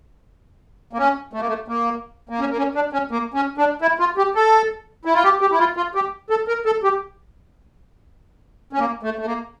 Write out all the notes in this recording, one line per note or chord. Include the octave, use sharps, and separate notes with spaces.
A#3
C#4
A3
A#3
A3
A#3
A#3
C#4
A#3
C#4
D4
C#4
A#3
C#4
D4
E4
F4
G4
A4
E4
F4
G4
G4
E4
F4
F4
G4
A4
A#4
A4
G4
C#4
A#3
A3
A3
A#3